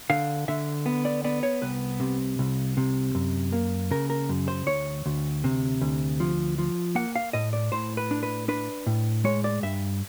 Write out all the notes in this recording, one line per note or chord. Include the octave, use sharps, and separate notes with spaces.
D3 F5
D3 E5
B3
D5
B3 D5
C#5
C2 B4
C3
C2
C3
F#2
A#3
C#3 A#4
A#4
F#2
C5
D2 C#5
D2
C3
D2
F3
F3
A#3 F#5
F5
A2 D#5
D5
A2 C5
B4
D4
B4
D4 B4
A2
G#3 C#5
D5
G2 E5